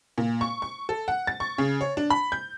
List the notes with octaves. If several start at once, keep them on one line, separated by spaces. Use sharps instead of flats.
A#2
C#6
C#6
A4
F#5
A6
C#6
C#3
C#5
D4
B5
G6